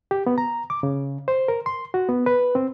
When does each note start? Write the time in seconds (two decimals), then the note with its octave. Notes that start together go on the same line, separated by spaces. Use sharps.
0.11 G4
0.27 B3
0.38 A#5
0.70 D6
0.83 C#3
1.28 C5
1.48 A#4
1.66 C6
1.94 F#4
2.09 B3
2.26 B4
2.55 C4